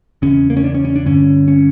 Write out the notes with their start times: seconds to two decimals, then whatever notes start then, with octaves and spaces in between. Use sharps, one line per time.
0.22 E2 C#3 C#4
0.50 A#3
0.57 C#4
0.64 D4
0.75 C#4
0.85 C#4
0.96 D4
1.05 G2 D3 C#4
1.48 C#4